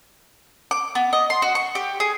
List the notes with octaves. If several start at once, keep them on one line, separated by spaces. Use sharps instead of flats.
D6
B3
D#5
C6
F#4
C#6
G4
G#4